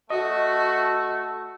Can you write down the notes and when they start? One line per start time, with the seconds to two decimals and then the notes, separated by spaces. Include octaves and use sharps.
0.10 A3 F#4 D#5